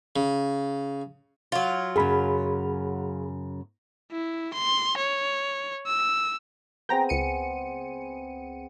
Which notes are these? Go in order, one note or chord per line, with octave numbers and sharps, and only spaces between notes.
C#3
F#3 F4
F#2 C#3 G#4 B5
E4
C6
C#5
E6
B3 C4 G#4 G5 A#5 A#6
C#2 C#7 D#7